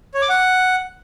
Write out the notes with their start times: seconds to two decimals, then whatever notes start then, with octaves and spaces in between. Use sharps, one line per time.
0.14 C#5
0.22 D6
0.29 F#5